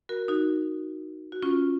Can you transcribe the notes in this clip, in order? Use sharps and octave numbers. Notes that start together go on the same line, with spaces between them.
F#4 A#4
D#4 F#4
F#4
C#4 F4